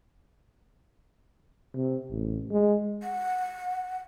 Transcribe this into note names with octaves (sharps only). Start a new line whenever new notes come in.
C3
A1
G#3
F#5